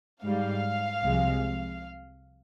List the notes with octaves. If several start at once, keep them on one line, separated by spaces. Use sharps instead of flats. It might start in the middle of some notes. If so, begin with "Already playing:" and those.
G#2 G3 F5
C2 C3 F3 G#3